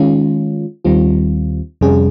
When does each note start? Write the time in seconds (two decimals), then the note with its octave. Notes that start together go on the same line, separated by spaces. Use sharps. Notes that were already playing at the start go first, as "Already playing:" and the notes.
Already playing: D#3 G#3 C#4 F4
0.85 D#2 D#3 G3 C4 F4
1.81 F2 C3 G3 C#4 G#4